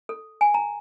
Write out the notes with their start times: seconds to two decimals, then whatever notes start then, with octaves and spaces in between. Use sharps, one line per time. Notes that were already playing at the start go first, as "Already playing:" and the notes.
0.09 A4
0.41 G#5
0.54 A#5